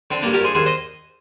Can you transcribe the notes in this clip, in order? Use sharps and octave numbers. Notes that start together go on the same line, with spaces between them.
D3 C4
A#3 D4
G2
G4 A#4
G2 G#4 C5
D#2 G#4 C5
C5 D#5